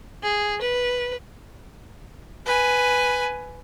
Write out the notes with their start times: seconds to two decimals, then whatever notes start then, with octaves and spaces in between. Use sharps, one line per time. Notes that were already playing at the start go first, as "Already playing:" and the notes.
0.23 G#4
0.62 B4
2.46 B4 G#5